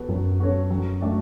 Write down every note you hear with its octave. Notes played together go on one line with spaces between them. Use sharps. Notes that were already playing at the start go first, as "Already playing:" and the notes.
Already playing: B3 F#4 A4
F#2 F#3
B3 F#4 A4 C#5
F#3
A3 D4 F#4